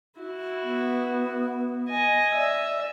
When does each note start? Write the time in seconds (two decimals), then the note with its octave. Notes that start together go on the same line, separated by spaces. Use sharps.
0.20 E4 F#4
0.64 B3
1.89 D#5 G#5
2.35 D5 E5